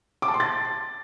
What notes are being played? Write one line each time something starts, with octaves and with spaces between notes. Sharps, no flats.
D6
A5
C6
A6